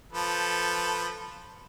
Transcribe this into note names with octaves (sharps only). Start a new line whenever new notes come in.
F3 A4 B4